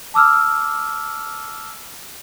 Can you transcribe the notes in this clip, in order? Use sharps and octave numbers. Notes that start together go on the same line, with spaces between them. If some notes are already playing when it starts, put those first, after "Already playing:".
A5 D6 E6 F6